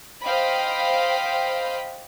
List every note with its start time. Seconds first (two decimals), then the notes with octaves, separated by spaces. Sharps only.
0.23 C5 D#5 F5 G5 B5